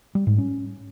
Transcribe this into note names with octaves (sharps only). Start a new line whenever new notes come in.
G3
G#2
C#4